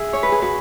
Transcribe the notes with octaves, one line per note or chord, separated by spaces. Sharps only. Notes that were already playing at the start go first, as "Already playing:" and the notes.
Already playing: G#4 E5
C#5
B4
G#4
F#4 B4